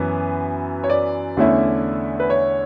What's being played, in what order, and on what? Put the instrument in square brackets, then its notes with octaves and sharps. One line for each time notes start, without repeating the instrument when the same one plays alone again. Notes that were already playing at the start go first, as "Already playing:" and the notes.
Already playing: [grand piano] F#2 E3 B3
C#5
D5
E2 D3 A3 C#4 E4
B4
C#5